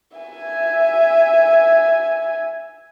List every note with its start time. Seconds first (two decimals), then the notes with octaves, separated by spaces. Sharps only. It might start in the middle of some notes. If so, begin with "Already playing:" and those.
0.17 E5 G#5